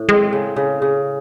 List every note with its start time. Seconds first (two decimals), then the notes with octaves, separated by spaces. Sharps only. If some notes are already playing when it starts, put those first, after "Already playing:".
Already playing: A2
0.09 G#3 C4
0.33 C#3
0.56 C#3
0.82 C#3